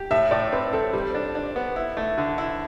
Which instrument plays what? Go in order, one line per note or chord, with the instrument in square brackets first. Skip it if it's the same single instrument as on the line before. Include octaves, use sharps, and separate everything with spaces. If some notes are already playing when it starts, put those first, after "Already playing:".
Already playing: [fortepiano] G4
[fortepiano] A2 [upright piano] E5
[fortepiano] A2 [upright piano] D5
[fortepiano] C4 [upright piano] B4
[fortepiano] C4 [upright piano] A4
[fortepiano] G3 [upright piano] C5
[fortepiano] D4
D4
B3
E4
A3
D3
E4